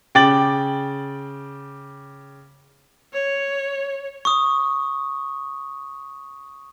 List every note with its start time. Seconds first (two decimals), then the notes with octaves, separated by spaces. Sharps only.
0.15 C#3 G5 D6 A6 F#7
3.13 C#5
4.25 C#6 D#6